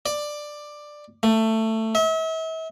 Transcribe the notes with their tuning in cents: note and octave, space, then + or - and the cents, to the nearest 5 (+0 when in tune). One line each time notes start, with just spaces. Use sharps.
D5 +10
A3 +15
E5 -40